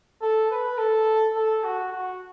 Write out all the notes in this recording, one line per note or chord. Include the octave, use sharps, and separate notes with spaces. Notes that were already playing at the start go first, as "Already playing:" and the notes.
A4
B4
A4
A4
F#4
F#4